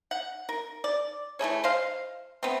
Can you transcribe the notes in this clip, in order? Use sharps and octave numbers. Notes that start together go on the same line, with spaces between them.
F#5
A#4
D5
E3 A3 G#4 C#5
C5 D#5 F5
A3 B3 C4